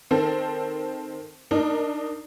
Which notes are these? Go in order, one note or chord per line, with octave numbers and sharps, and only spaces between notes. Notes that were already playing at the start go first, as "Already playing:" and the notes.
D#3 C4 A4
D4 D#4 A#4